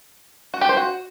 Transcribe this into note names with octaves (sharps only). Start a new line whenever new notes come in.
F#4
G4
C5
F#4